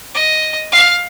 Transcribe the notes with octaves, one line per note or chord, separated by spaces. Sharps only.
D#5
F5